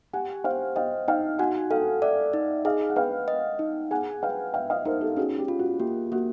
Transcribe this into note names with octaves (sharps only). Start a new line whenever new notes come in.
G4 F#5 G#5
C5 F5 G5
D#5 F5 G5
D#4 F5 G5
F#4 F#5 G#5
A4 F5 G5
D5 E5 F#5
D#4
G#4 D#5 F5
F#5
B4 F5 G5
D#5
D#4
G#4 F#5 G#5
B4 F5 G5
E5 F5 G5
D#5 F5
D#4 A#4 C5
G4 A4
C#4 F#4 G#4
G4
F4
F#4
A#3 G4
A#3 F#4